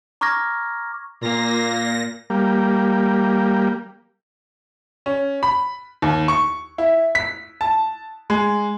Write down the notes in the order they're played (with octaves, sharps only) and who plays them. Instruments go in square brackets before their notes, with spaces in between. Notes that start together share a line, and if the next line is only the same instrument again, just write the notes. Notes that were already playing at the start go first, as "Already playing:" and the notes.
[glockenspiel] A#5 C#6 D6 F6 G#6 A#6
[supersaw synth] A#2 A#6 [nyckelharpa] A#3 F4
[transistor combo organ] G3 A#3
[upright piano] C#4
B5
D#2
C#6
E4
B6
A5
G#3